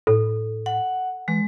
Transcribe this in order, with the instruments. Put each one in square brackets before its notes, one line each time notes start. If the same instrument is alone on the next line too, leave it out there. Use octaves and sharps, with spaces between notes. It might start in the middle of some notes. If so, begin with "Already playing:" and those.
[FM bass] A2 [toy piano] A4
[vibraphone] F#5
[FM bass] E3 [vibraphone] G#3